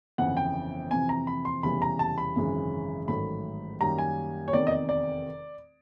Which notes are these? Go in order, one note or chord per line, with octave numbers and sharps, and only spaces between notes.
G1 F2 C#3 E3 F#5
G5
F2 C3 E3 G#5
A#5
B5
C6
F1 E2 C#3 E3 G3 B5
A#5
A5
B5
G#1 F#2 C#3 E3 G#3
A1 G#2 D#3 F#3 A3 B5
F#2 D#3 G3 A#3 C#4 A#5
G#5
C#5
F1 E2 C3 D#3 D5
D#5
D5
D5